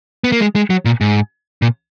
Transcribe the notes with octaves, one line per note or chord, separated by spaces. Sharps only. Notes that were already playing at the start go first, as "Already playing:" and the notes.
B3
A#3
G#3
G#3
F#3
A#2
G#2
A#2